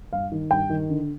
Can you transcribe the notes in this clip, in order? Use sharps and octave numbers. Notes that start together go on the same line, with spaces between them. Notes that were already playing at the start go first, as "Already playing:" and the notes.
G2 F5
D#3
G2 G5
D#3
D3